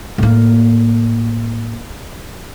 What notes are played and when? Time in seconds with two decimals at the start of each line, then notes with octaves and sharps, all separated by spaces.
0.18 A2 A#3